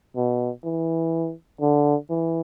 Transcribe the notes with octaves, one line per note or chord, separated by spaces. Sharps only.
B2
E3
D3
E3